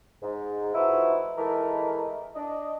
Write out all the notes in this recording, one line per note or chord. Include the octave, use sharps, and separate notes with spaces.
G#2
F3 A3 D#4 E4 F#4 B4
E3 G#3 A3 D#4 A#4
D4 D#5